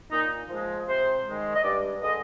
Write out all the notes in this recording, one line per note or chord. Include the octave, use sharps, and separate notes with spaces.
A#2 D#4
F3 G#3
C3 C5
D#3 G#3
D#5
G2 D5
D3 G#3 D#5